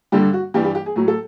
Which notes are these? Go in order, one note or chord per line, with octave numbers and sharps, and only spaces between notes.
G2 D3 G3 G4
F#4
G2 E3 G3 G4
G4
G4
G#4
A2 F#3
A4